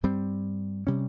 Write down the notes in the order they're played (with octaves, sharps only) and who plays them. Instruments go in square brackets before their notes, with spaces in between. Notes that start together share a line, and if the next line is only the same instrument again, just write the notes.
[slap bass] G2 G3 C4
C3 G3 C#4